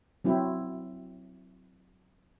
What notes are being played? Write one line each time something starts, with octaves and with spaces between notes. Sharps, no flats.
F#3 C4 E4